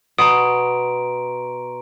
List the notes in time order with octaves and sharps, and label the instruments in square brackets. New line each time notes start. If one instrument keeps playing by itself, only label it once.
[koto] B2 [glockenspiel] A#5 C6 D7 [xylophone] D#6